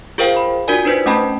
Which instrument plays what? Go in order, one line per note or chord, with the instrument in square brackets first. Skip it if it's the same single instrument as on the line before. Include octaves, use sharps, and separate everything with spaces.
[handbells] F4 G#4 A#4 C5 F5 G5
B5
D4 F4 F#4 A#4 D5 G#5
D4 D#4 B4 C5 G6 B6
A3 C#4 D#5 G5 A5 B5